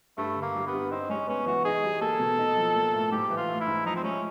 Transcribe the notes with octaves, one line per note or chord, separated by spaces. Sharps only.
G2 A3
D3
A#3
G3
B3
G2
C4 D#4
G#3 C#4
B3 C#4
E3 F#4
D#4 G#4
G3
A#3 A4
B2
D#4
F3
A#3
A2
G#2 G4
E3
F4
A3
E4
G#2
F3 D#4
C4
G#3 C#4